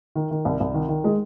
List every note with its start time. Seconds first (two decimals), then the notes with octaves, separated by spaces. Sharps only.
0.16 D#3
0.31 D#3
0.45 C2
0.60 C2
0.74 D#3
0.89 D#3
1.04 G#3